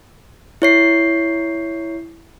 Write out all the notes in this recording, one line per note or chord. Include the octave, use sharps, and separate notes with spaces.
E4 C#5 C7